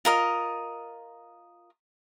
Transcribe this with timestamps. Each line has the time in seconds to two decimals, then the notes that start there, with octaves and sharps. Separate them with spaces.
0.05 F4 A#4 D#5